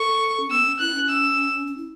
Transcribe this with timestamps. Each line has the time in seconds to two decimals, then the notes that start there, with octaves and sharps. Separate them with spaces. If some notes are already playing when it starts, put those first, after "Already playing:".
Already playing: A4 C#6
0.40 C#4
0.51 B3 E6
0.66 C#4
0.79 E4 F#6
0.94 C#4
1.09 E6
1.67 C#4
1.78 E4